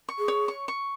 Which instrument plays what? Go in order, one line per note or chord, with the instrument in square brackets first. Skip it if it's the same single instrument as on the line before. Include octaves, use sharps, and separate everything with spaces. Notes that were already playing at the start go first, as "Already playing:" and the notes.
[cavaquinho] C#6
[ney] G#4
[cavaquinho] C#5
C#6
C#6